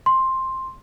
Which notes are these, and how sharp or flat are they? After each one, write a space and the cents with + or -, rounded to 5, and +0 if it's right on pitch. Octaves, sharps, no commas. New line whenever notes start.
C6 +10